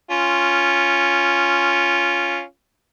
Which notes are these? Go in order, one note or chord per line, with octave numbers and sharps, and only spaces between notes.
C#4 F4